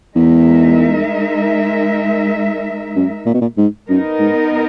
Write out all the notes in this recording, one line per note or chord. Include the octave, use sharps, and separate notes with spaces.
E2 G#3 D#4 A#4 E5
F#2
A#2
B2
A#2
G#2
F#2 B3 D#4 A#4
G#2